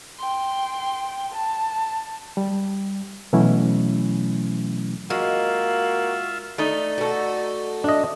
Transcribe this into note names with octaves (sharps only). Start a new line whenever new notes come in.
G5 C6
A5
G3
B2 E3 F#3 A3 C#4 E4
G#3 A#3 F4 F#4 E5
A3 D#4 D5
F#4 A4
D4 D#5 E5